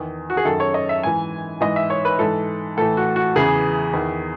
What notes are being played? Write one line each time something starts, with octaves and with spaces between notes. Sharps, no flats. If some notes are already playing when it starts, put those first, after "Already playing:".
Already playing: E2 D#3
F#4
G#4
F#2 D#3 A4
C#5
D#5
E5
G#2 E3 G#5
G#2 E3 D#5
E5
C#5
B4
G#2 E3 A4
A2 E3 A4
F#4
F#4
E2 C#3 E3 G#4
E2 D#3